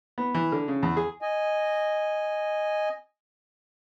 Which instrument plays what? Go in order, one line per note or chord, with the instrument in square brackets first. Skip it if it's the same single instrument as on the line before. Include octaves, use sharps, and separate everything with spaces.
[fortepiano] B3
E3
D3
C#3
E2
G#4
[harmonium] D#5 G#5